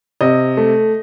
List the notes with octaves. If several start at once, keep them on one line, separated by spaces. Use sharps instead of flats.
C3 D#5
A3